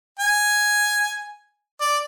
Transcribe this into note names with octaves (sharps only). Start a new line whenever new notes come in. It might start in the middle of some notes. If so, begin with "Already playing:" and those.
G#5
D5